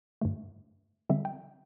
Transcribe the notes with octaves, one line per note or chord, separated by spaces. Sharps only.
G2 D3 A3
D3 G3 C4 E5
G5